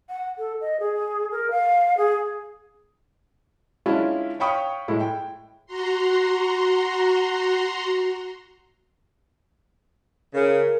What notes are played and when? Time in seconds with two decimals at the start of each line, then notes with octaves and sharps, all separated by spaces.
0.09 F#5
0.38 A4
0.61 D#5
0.80 G#4
1.32 A#4
1.51 F5
1.98 G#4
3.86 G#3 C#4 D4 E4 F4
4.40 C#5 F5 G5 B5 C#6 D#6
4.88 A2 G#3 E4
5.00 G5
5.66 F#4 A#5 C6
10.34 C#3 A#4